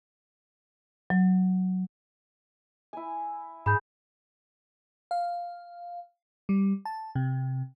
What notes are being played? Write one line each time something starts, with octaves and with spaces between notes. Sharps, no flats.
F#3
E4 G#5
G#2 G#4 B5 G6
F5
G3
A5
C3